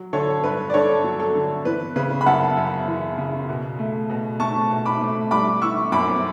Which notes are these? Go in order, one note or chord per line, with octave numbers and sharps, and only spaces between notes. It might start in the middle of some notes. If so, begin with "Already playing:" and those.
Already playing: F#3
D3 A4 C#5
G2 B4
D5
G2 A4 C#5
F#3
A4
D3
E3 B4
C#3 B4
B5
F#2 F#5 A5
F#2
E3
C#3
B2
A3
B2
A3 A5 C#6
B2
B5 D6
A3
G3 B5 D6
E3 C#6 E6
F#2 B5 D6